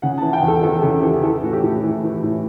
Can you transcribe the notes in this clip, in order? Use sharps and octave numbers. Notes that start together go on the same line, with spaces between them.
C#3 F#5
E3 A5
G5
E2
A4
E2 A4
C#3 A4
E3 G4
E3 A4
A2 F#4
G4
A2
E3
E3
A2